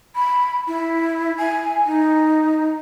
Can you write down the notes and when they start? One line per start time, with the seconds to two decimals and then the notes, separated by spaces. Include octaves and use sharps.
0.16 B5
0.68 E4
1.38 G#5
1.86 D#4